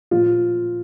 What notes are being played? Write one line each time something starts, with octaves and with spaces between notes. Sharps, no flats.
A#2 F3 F4